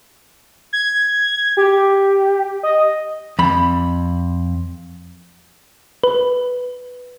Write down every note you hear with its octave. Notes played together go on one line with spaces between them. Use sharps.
G#6
G4
D#5
F2 B5
B4